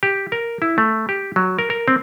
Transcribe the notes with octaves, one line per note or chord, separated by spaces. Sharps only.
G4
A#4
E4
A3
G4
F#3
A#4
A#4
C4